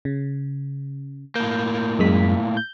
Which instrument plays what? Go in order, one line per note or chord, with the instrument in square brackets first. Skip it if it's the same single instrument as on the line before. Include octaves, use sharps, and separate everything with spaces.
[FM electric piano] C#3
[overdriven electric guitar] A2 A#3 [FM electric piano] G6
[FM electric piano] F#2 G#3 B6
G6